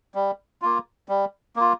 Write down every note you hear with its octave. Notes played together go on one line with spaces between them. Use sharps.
G3
A#3 F4
G3
A#3 F4